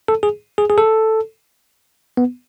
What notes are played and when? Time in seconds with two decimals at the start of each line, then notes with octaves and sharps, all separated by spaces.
0.08 A4
0.23 G#4
0.58 G#4
0.70 G#4
0.78 A4
2.17 B3